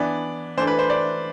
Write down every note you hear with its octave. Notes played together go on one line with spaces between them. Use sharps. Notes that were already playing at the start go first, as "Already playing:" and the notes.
Already playing: E3 B3 D4 D5
E3 A3 D4 C5
B4
C5
D5